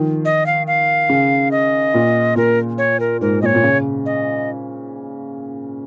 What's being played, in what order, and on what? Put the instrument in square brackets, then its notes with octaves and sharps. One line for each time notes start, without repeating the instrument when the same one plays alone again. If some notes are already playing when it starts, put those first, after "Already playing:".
Already playing: [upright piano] D#3 F3
[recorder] D#5
F5
F5
[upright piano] C#3
[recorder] D#5
[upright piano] A#2
[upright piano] A#2 [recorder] A#4
[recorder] C#5
A#4
[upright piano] G#2 [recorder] A#4
[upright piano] A#2 [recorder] C#5 D#5
[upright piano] A#2
C#3
[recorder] D#5